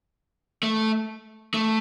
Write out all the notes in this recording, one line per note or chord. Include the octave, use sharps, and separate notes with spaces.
A3
A3